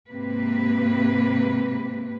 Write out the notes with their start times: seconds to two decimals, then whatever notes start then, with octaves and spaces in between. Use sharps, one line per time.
0.11 G#2 C3 A#3 C4 B4